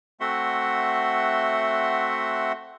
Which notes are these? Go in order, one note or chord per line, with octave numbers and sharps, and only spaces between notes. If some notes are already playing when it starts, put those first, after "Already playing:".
A3 C4 F#4 E5 F#5 C6